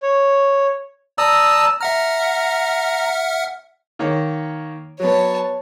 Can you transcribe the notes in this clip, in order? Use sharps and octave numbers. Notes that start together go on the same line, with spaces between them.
C#5
D5 A5 A#5 D#6 E6
E5 F#5 A#5 F6
D#3 A#3 C#5
F#3 B3 C#5 A5